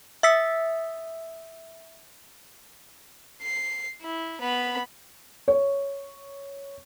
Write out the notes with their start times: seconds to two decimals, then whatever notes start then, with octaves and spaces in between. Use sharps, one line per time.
0.23 E5 D#6 E6 B6 C#7
3.43 C7
4.02 E4
4.41 B3 B5
5.48 C#5